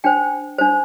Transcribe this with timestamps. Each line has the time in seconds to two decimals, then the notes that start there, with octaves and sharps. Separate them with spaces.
0.04 D4 C5 G5
0.58 D4 C5